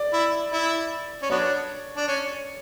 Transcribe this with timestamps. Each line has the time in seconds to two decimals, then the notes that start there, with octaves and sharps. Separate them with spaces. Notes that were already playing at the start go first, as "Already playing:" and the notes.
Already playing: D5
0.13 E4
0.52 E4
1.23 C#4
1.30 F#3 B3 D4 C#5
1.97 D4
2.08 C#4